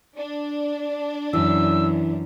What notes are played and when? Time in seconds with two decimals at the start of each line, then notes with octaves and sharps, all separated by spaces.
0.19 D4
1.33 F#2 E3 E6